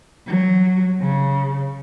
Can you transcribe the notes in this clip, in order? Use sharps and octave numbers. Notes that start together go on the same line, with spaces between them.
F#3
C#3